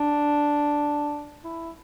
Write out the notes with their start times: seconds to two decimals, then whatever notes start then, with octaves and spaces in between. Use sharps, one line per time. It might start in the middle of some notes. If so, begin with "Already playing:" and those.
Already playing: D4
1.44 E4